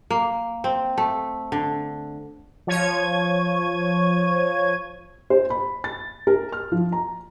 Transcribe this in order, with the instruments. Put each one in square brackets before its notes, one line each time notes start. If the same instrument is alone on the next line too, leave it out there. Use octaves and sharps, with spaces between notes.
[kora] A#3
C4
A3
D3
[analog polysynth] F3 C#5 G#6 D#7
[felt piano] C5
B5
A6
A#4
F6
F3
A#5